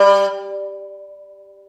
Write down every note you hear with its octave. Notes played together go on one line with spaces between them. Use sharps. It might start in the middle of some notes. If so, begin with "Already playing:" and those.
Already playing: G3